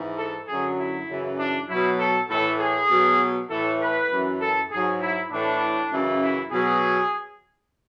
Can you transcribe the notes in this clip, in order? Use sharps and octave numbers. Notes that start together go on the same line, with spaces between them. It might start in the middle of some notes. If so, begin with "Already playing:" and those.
Already playing: G#2 E3
A4
F#2 D3 F#3 G#4
E4
F#2 C#3 E3
D4
B2 F#3 E4
A4
A2 E3 A4
G#4
B2 F#3
A2 E3 A4
B4
F#2 E3
A4
G#2 F#3 G#4
E4
A2 E3 D4
F#2 C#3 E3
E4
B2 F#3 G#4